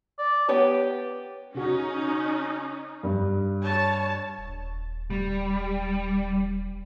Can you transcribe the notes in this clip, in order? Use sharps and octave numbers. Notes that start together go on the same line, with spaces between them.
D5
B3 G4 B4 C#5
C#3 C#4 D#4 F#4
G2
C#5 A5
D#1
G3